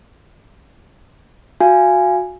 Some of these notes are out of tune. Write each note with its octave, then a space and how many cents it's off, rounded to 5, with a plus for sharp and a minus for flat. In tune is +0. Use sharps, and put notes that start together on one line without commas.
F#4 -20 F5 -25 G#5 +0